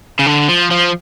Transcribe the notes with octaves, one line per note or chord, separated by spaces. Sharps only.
C#3
D3
F3
F3